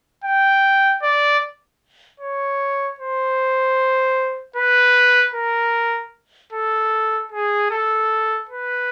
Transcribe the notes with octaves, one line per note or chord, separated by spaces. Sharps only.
G5
D5
C#5
C5
B4
A#4
A4
G#4
A4
B4